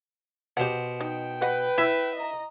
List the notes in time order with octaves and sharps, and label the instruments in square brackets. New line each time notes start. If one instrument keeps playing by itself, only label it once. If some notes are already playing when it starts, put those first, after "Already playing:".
[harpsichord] B2 C5 [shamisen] G4 F#5
[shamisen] D#4 [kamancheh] G5
[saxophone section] B4 [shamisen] D#5 F#5
[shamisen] E4 [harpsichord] E5
[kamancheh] D#5 A#5